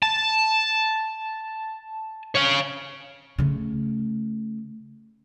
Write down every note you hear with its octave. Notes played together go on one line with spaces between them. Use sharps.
A5
C#5 F5
C#3 A3